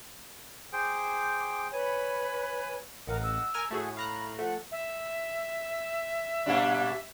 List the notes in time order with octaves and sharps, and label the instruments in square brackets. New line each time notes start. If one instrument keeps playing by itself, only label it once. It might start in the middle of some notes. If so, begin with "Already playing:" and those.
[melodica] G#4 C5 G5 [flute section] D6
[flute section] B4 C#5 B5 [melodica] G#5
[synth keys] A1 [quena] A#4 [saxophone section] D#5 F5 F#5
[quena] E6
[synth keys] A#4 G#5 F6
[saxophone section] A2 [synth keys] A3 F#4 G#4
[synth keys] F5 A#5 F#6 [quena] B5
[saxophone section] F3 [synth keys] A3 [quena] F#5
[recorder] E5
[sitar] A#2 G3 D4